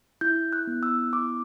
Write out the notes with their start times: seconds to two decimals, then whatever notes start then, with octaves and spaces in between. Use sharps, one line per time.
0.21 E4 G6
0.53 F#6
0.67 B3
0.83 E6
1.13 E4 D6